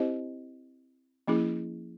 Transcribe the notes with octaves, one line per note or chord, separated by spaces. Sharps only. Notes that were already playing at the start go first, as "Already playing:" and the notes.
Already playing: C4 E4 G4 C5 D#5
F3 A#3 C#4 E4 G#4